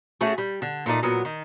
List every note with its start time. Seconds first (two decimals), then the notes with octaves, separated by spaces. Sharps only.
0.21 A3 C#4 F#4 G#4
0.38 G3
0.62 D3
0.86 A#2 A3 D#4 D5
1.03 A#2 F#3 B3
1.25 D#3